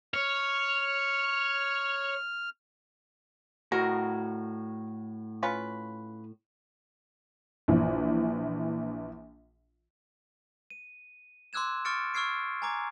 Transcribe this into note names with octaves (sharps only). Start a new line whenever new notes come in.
C#5 F6
A2 F#4 A#4
C#4 F4 B4
A#1 E3
D#7
C6 D6 E6 F#6 G#6 E7
C#6 D6 F6 A6 C#7 D7
C#6 E6 F6 G#6 C7 D7
G#5 A#5 D6 G#6